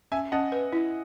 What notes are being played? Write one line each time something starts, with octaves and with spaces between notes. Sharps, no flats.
C#4 E5 G#5
C#4 D#5 F#5
B4
E4